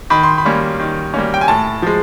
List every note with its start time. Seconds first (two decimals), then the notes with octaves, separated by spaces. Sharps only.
0.10 D#3 B5
0.23 C6
0.38 B5
0.45 G3 A#3 C#4
0.80 D#3
1.14 G3 A#3 C#4
1.34 G5
1.41 G#5
1.48 A2 A5
1.82 F3 G#3